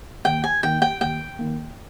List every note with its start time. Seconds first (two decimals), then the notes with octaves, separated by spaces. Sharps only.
0.25 D#2 G5
0.44 G#5
0.63 D#3 A#3 G5
0.82 G5
1.01 D#2 G5
1.39 D#3 A#3